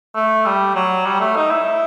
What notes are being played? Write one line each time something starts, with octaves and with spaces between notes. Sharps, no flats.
A3
G3
F#3
G3
A3
D#4
E4